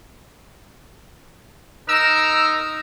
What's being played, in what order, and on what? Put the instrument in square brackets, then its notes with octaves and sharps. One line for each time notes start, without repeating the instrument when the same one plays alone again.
[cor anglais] D#4 [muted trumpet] A#4 [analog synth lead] E6